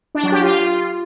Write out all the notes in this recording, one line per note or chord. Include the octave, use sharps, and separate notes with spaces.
D4
F#3
G4
F4